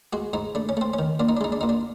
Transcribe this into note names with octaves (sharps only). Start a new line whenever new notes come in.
G#3 F#4
G#2 D#4
A3 D4
C#4
A3 C4
C#4
D#3
A#2 D4
D#4
D4
G#3 D#4
D4
A#2 D#4
D4